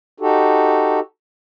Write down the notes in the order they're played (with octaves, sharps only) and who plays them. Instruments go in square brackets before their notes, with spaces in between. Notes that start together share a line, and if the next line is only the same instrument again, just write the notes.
[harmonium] D#4 F#4 G4 A4